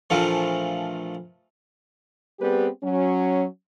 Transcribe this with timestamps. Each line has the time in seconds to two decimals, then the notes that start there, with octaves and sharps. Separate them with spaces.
0.10 A#1 E3 F3 A3
2.40 G3 B3 C4 G4 G#4 B4
2.83 F#3 C#4